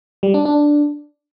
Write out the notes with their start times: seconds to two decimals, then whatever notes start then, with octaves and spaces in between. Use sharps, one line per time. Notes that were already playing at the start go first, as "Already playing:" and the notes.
0.23 G3
0.34 D4
0.45 D4